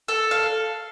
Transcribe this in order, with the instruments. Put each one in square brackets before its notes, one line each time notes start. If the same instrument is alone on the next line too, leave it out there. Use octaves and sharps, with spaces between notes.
[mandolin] A4
F5